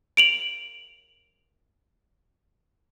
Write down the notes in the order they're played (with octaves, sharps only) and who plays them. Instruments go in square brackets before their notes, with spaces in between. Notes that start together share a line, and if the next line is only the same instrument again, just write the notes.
[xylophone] D7 F7 F#7